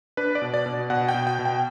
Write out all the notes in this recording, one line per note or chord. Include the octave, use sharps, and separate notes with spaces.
D4 B4
D5
B2
D5
B2
B2 F#5
G5
B2
G5
B2
G5